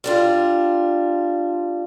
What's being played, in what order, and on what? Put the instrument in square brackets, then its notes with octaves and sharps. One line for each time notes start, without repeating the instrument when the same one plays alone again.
[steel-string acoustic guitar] G3 D4 F4